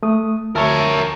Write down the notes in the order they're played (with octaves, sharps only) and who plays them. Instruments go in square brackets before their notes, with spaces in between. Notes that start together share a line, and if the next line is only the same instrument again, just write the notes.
[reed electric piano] A3 D#6
[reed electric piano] D2 E5 A5 [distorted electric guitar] A#4 C#5